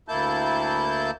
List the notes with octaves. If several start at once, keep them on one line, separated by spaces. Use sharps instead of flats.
D2 A#3 E4 A5 G6